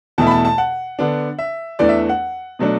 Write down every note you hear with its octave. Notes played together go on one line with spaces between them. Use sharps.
E2 B2 A3 E4 A5
B5
A5
A5
F#5
D3 B3 D4
E5
E2 E3 A3 D4 D5
E5
F#5
B2 F#3 A3 D4